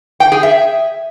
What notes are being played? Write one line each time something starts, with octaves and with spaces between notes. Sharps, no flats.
G5
G#4
E5